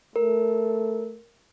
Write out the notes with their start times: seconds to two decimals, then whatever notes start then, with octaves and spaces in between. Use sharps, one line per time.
0.16 A3 A#4